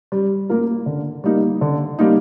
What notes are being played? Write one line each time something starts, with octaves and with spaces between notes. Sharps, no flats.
G3
A#3 F4 A#4
D3
G3 A#3 D#4
D3
G3 A#3 D#4